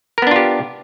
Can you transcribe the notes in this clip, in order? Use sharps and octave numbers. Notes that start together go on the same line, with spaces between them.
B3 D4 F4 G4 A#4